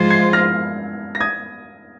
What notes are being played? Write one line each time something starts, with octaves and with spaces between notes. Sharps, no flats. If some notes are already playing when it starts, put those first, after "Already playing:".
Already playing: G#2 F3 G#3 F4 C5 G#6 C7
G#6 C7
F6 A#6
A#6
D#6 G#6